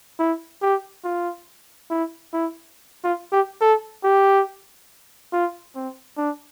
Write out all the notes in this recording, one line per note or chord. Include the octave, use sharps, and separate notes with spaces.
E4
G4
F4
E4
E4
F4
G4
A4
G4
F4
C4
D4